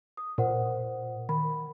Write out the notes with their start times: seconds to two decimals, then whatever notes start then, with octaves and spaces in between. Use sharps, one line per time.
0.17 D#6
0.38 A#2 A#4 C5 F#5
1.29 D#3 B5